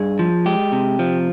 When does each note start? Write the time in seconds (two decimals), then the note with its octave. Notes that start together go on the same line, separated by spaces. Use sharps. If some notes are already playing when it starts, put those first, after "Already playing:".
Already playing: G2 G#4
0.19 F3
0.46 G#3 G4
0.72 C3
0.99 F3